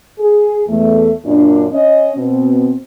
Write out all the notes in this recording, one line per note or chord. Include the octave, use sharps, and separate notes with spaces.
G#4
E2 A3
F#2 A#2 D4
C#4 D#5
B2 C4